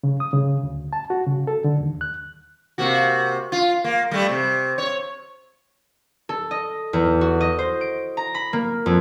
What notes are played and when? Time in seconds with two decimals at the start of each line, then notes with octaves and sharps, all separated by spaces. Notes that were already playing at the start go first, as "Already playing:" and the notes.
0.03 C#3
0.20 D#6
0.33 C#3
0.63 D2
0.93 A5
1.10 F#4
1.27 C#3
1.47 A4
1.64 D3
1.80 D#2
2.01 F#6
2.78 C3 A#3 F#4
3.52 F4
3.84 A#3
4.11 G3 A3
4.29 C3
4.78 C#5
6.29 A4
6.51 D#5
6.93 E2
7.21 F#4
7.41 D#5
7.59 C5
7.81 D7
8.17 A#5
8.35 B5
8.53 A#3
8.86 F2